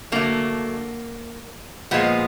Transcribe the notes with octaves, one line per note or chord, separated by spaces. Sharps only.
D3 F#3 A3 A#3
A#2 F3 G#3 B3